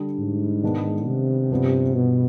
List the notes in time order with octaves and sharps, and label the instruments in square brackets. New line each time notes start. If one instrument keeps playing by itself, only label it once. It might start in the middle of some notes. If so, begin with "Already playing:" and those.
Already playing: [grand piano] D3 G3 D4
[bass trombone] G#2
[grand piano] D#3 G#3 B3 D4
[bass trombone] C3
[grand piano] G2 F3 B3 D4 G4
[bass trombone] B2